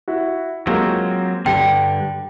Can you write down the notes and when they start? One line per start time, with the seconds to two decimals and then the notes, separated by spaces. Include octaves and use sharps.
0.08 E4 F#4
0.67 F#3 G#3 A#3 C4 F4
1.46 G2 D3 G4 G5